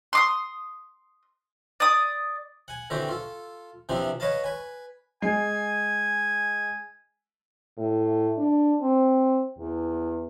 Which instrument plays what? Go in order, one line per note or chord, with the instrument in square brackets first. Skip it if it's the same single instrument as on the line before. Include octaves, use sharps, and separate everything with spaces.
[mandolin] C6 D6 D#6
D5 D#6
[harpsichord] F#5 G#5
D3 E3 C4 F#4 G4
F4 A4
C3 E3 F3 C4 D4
B4 C#5 D#5 F5 A5
B4 G#5
[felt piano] G#3 C7 [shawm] G#5
[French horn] A2
D4
C4
E2